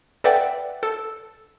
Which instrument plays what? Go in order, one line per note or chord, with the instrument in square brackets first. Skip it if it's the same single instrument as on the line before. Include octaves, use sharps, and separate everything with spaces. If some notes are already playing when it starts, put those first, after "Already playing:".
[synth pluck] A4 B4 D5 E5 F#5 G5
A4